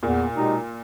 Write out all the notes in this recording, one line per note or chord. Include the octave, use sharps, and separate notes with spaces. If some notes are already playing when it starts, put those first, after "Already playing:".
E2 A#2
B2 G#3 D#4 G4